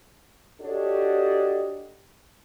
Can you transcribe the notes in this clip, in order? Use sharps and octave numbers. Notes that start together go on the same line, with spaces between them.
D4 F#4 G4 A4 C#5 D#5